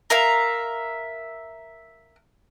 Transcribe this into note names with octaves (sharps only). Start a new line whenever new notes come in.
A#4 E5 F5